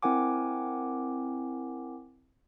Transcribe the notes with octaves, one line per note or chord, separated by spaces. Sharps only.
C4 E4 A#4 F#5 G#5 D6